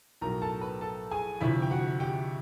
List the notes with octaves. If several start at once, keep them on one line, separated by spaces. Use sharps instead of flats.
B1 A2 F#3 A#4 A#5
A4 A5
B4 B5
A4 A5
G#4 G#5
D2 C3 F3 E4 E5
G5
F#4 F#5
G4 G5